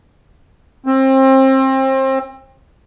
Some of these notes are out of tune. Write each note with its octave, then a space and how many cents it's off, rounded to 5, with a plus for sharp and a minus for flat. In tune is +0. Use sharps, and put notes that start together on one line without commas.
C4 +30